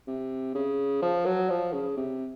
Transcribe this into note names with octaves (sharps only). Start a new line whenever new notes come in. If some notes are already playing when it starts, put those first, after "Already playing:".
C3
C#3
F3
F#3
F3
C#3
C3